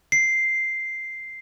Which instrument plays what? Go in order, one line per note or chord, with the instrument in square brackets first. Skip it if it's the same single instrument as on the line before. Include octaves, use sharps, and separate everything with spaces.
[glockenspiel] C7